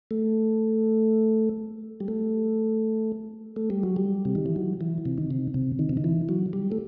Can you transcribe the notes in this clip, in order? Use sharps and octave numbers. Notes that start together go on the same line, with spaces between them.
A3
G3
A3
A3
G3
F#3
G3
C3
D#3
E3
F#3
E3
C3
D#3
C3
C3
D#3
C3
D#3
E3
F#3
G3
A3